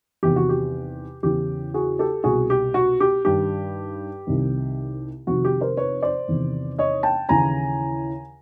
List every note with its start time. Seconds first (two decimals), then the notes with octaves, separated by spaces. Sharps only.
0.23 E2 C3 D#3 G4
0.36 F#4
0.49 G4
1.23 E2 C#3 E3 G4
1.74 F#4 G#4
1.99 G4 A4
2.24 C2 B2 F#4 G#4
2.50 G4
2.74 F#4
3.00 G4
3.25 G2 D#3 G4
4.27 C2 C3 D#3
5.27 F2 C3 D#3 F#4
5.45 G4
5.61 A#4 C5
5.77 B4 C#5
6.02 C5 D5
6.28 E2 C3 D#3
6.78 C#5 D#5
7.03 G5 A5
7.29 D#2 C#3 E3 G#5 A#5